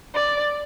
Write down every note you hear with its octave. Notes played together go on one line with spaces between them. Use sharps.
D5